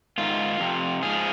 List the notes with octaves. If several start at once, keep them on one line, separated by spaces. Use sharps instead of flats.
G#2 D#3 F4
F2 C3
G#2 F3 G#4